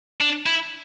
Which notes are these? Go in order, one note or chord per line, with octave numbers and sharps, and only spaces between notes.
D4
E4